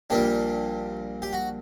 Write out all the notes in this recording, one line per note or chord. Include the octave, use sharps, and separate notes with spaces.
A#1 A#2 G3 A#3 D4 G4
G4
F#4